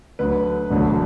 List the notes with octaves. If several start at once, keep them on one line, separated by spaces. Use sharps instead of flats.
D2 D3 F#3 B4
E1 D2 D3 F#3